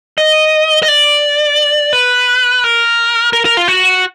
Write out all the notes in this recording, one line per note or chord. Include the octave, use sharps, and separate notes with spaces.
D#5
D#5
D5
B4
A#4
A#4
A#4
F4
F#4